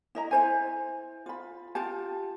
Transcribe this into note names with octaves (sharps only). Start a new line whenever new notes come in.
E4 D#5 A#5
E4 C5 G#5
F4 B5
F4 G4 A5